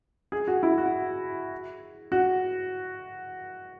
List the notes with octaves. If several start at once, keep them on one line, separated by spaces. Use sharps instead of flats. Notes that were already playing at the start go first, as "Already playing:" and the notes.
G#4
F#4
E4
F#4
F#4